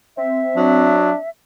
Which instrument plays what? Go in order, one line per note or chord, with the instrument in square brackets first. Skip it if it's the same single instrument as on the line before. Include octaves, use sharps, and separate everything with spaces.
[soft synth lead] C4 [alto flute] E5
[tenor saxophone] F#3 [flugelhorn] D4